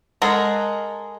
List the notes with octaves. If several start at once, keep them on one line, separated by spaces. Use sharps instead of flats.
G#3 A4 A#4 F#5 A#5